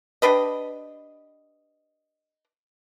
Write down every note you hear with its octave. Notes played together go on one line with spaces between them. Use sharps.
D4 G4 B4 D#5